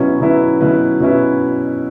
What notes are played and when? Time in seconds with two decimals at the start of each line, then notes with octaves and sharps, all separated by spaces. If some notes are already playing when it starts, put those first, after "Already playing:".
Already playing: B2 F#3 C#4 E4 B4
0.20 B2 F#3 C#4 E4 B4
0.61 B2 F#3 C#4 E4 B4
1.00 B2 F#3 C#4 E4 B4